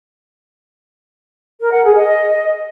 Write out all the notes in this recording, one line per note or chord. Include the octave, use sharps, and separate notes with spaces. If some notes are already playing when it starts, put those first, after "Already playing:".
A#4
F#5
G#4
D#5